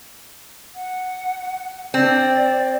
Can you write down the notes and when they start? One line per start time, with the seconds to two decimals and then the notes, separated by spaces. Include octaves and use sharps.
0.75 F#5
1.94 C4 D5